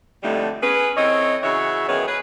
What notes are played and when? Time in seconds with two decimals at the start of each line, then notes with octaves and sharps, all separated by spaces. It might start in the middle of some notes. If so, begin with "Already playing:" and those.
0.23 F2 A2 D3 G3 A3 D#4
0.62 C#4 G#4 B4
0.96 E3 C4 A4 C#5 D#5
1.42 C#3 E3 F#4 C#5 E5
1.88 F#2 D#3 E3 B3 G#4 C#5
2.07 G#4 B4